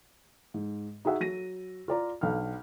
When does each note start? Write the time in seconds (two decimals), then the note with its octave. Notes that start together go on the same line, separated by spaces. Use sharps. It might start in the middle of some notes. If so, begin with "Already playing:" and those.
0.54 G#2
1.05 D#4 F#4 G#4 E5 F#5
1.20 F#3 A#6 D#7
1.88 F4 D5 A#5
2.21 B1 D4 F5 F6